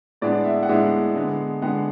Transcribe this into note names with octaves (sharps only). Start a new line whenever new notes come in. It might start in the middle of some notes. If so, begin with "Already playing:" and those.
A2 G#3 B3 D4 D5
E5
F#5
A2 G#3 B3 D4 E5
D3 G#3 B3
D3 G#3 B3 F#5